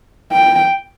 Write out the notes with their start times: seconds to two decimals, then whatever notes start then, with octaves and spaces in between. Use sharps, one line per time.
0.32 G5